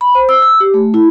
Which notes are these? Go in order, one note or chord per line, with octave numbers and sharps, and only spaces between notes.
B5
C5
E6
E6
G4
A3
E4